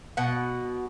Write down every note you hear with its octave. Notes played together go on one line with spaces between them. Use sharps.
B2 F#5